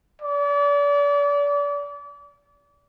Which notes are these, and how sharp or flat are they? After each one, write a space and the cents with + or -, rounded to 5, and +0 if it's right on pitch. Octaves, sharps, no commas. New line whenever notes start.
D5 -35